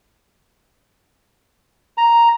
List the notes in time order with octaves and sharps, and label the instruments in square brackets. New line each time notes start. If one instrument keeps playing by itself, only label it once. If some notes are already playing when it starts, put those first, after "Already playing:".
[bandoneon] A#5